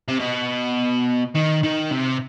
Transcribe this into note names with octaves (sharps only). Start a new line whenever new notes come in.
C3
B2
D#3
D#3
C3